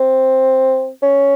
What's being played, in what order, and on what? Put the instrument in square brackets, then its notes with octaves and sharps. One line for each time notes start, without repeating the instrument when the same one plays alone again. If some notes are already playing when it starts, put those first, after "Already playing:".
Already playing: [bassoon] C4
C#4